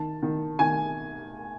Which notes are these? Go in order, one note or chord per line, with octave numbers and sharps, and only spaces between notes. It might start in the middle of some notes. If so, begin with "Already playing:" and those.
Already playing: D#3 A5
D#3
D#3 G#5